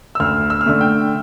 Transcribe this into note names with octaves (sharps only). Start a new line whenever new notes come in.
E6
D2 F6
E6
F6
D3 A3 E6
G5